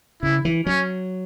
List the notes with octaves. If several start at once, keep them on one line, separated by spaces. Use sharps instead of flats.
C#3 E4
E3
F#3 C#4